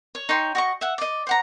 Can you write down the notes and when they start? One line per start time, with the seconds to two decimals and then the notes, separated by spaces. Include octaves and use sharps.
0.15 C#5
0.29 D#4 C#5 G5 C6
0.55 F#4 D#5 C#6
0.81 E5 F#5
0.98 D5 D#5
1.27 C5 F#5 A#5